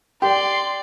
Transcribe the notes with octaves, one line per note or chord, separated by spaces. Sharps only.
G4 D5 C6